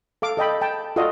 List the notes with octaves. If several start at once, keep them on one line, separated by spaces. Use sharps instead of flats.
A4 F5 D6
A4 D#5 G5 B5
G5 A5
F4 F#4 A4 D5 D#5 F5